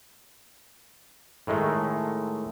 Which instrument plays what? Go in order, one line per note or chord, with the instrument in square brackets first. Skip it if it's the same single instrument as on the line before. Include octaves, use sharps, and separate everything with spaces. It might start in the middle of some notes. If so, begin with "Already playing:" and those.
[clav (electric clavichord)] A2 D#3 G#3 A3